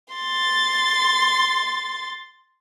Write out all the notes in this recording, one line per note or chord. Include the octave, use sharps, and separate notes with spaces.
C6 A6